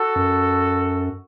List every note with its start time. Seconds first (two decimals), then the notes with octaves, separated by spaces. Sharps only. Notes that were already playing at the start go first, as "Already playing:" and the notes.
Already playing: F#4 A4
0.16 F#2